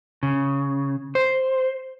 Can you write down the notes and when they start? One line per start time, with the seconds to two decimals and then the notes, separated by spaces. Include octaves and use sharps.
0.23 C#3
1.15 C5